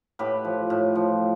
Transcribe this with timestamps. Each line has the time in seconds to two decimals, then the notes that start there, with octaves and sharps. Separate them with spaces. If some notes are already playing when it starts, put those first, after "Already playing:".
0.19 A2 G4 B4
0.45 F3
0.70 A2
0.95 F3